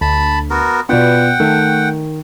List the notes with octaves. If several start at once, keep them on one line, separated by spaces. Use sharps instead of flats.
D2 A5 B5
B3 F#4 A#4
B2 B3 F4 B4 D5 F#5 G5
D#3 A3